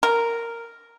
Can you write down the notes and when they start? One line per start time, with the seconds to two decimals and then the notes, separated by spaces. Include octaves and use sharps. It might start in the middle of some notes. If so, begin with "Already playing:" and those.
0.03 A#4